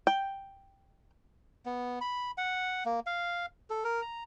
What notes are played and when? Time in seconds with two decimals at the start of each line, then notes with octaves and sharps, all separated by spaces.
0.07 G5
1.66 B3
2.01 B5
2.38 F#5
2.85 A#3
3.06 F5
3.70 A4
3.84 A#4
4.02 A#5